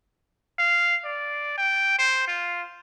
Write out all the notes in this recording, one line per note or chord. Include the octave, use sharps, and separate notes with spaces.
F5
D5
G5
C5
F4